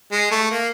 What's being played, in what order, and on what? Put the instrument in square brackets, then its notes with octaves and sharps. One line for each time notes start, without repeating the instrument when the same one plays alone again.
[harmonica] G#3
A3
A#3